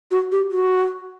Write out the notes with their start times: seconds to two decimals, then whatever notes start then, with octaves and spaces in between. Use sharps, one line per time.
0.11 F#4
0.32 G4
0.52 F#4